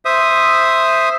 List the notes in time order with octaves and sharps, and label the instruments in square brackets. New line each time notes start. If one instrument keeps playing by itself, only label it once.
[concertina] C5 E5 D#6